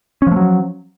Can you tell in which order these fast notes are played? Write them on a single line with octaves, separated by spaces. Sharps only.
C#4 F3 A3 F#3